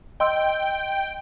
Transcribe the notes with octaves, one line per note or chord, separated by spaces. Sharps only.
D#5 G5 C6 E6